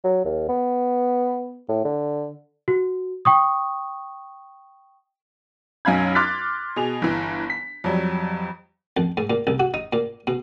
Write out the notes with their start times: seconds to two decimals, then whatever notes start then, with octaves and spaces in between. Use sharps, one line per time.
0.04 F#3
0.25 D#2
0.49 B3
1.69 A2
1.85 D3
2.68 F#4
3.25 G5 C#6 D#6
5.85 B1 F#2 C#4 F5 B5 G#6
6.15 C6 D6 F6 F#6 A6 B6
6.76 B2 G#4 F7
7.02 G1 E3
7.50 B6
7.84 F2 F#3 G3
8.97 F2
9.17 G#2
9.30 A#2
9.47 C2
9.60 F#4
9.74 D#4
9.93 A#2
10.27 B2